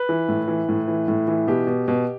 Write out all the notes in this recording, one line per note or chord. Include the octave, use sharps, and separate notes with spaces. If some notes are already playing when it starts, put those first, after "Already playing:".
Already playing: B4
E3
A2
E3
A2
E3
A2
E3
B2 G4
B2
B2